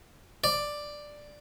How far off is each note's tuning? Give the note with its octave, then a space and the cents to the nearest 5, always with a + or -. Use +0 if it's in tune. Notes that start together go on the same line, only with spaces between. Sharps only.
D5 +5